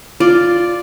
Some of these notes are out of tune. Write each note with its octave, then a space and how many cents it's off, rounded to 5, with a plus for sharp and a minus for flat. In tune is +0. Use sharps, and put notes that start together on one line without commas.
F4 +0 D5 +0